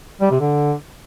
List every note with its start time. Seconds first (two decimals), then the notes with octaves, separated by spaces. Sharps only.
0.21 G3
0.31 C3
0.41 D3